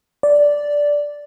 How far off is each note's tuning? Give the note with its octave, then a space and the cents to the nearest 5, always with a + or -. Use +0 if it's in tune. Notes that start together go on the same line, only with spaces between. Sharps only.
D5 -10